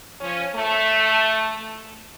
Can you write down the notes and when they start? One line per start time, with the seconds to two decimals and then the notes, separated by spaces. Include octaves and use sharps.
0.20 F3 C#4
0.55 A3